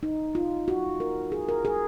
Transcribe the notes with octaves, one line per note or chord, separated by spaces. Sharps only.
D#4
F4
F#4
A#4
G#4
A#4
G#4